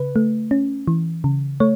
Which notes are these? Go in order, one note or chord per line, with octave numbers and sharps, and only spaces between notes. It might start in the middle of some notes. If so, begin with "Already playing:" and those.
Already playing: C#3 B4
A3
C#4
E3
C#3
A3 C#5